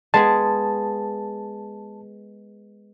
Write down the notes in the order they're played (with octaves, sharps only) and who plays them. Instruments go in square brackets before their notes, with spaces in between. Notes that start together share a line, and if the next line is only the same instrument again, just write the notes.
[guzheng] G#3 B3 G#4 [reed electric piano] A5